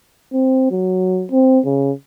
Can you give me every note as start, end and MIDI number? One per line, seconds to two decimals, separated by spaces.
0.33 0.67 60
0.71 1.26 54
1.31 1.60 60
1.65 1.91 49